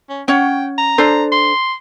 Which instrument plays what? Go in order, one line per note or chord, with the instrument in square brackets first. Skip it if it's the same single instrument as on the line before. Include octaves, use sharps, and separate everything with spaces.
[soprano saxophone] C#4
[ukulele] C#4 C#5 F#5 [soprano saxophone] G5
[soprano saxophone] A#5
[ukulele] D4 A4 C5
[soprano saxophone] C6